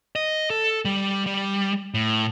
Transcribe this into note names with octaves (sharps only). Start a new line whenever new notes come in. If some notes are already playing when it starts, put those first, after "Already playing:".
D#5
A4
G3
G3
A2